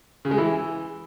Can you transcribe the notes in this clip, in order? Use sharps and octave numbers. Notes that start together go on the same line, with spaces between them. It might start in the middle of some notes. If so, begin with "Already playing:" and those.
C#3
G#3
E3